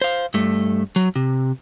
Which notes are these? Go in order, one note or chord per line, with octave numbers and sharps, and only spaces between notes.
C5 F5
G2 A3
F#3
C3